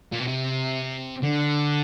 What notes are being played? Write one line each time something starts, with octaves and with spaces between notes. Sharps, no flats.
A#2
B2
C3
D3